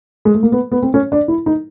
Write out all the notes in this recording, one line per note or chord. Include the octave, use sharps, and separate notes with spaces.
G#3
A3
A#3
B3
B3
C4
C#4
D4
E4
D#4